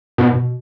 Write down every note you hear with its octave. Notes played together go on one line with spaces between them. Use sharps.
G#2 B2
B2